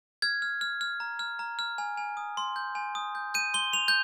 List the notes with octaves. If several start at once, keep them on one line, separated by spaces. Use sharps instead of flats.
F6 G#6
F6
F6
F6
A#5
F6
A#5
F6
G#5
G#5
D#6
C6
G6
G#5
D#6
G6
G6 D#7
C6 G7
C6 F7
G6